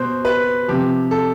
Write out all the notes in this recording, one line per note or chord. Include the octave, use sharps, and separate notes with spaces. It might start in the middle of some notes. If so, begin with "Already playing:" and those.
Already playing: B2 C5
B4
C3 F3 G4
A4